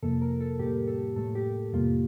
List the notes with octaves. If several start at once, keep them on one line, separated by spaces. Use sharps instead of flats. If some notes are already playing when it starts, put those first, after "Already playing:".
F2 C3 F3 A#3 A4
A#4
A4
A2 G3 A#3 G4
A4
A2 A3 A4
G4
F2 C3 G3 A#3 F4